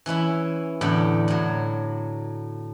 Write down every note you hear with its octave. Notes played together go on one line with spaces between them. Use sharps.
E3 C#4 E4 B5
E2 A2 D3 G5 B5
A2 F#3